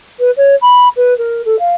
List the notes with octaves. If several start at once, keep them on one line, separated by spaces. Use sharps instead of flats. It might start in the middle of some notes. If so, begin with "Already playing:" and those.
B4
C#5
B5
B4
A#4
A4
F5